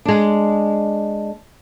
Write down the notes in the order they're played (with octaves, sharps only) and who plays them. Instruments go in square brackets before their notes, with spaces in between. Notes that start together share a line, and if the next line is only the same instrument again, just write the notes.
[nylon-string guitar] G#3 D4